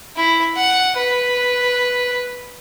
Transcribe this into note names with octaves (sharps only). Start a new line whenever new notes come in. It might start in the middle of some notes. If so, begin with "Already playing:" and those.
E4
F#5
B4